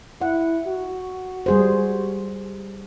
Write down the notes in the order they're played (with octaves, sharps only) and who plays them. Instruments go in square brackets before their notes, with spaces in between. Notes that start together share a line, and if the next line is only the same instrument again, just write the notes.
[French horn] E4 [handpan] F#5
[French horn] F#4
[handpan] G3 G#4 C5